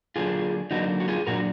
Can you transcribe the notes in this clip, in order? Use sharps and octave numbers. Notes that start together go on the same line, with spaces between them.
D3 F#3 A#3 D4 F4 G#4
D3 F#3 A#3 D4 D#4 F#4
F#4
F4 G#4
A#2 F#3 D4 F#4 A#4